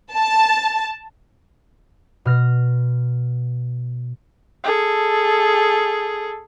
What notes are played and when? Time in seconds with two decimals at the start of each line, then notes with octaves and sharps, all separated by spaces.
0.13 A5
2.25 B2 F6 A#6
4.64 G#4 A4